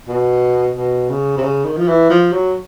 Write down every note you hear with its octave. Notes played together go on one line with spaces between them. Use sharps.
B2
B2
C#3
C3
C#3
D#3
F3
E3
F3
F#3